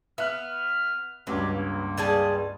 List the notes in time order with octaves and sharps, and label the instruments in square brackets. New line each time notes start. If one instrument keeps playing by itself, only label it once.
[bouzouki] B3 [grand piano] E5 F#6 [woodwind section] F6
[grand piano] C#2 G2 [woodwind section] B2 G4 [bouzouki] F#3
[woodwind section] A#3
[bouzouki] G3 G#4 A5